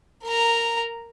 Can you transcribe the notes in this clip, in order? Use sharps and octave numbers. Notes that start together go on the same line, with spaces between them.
A#4 A#5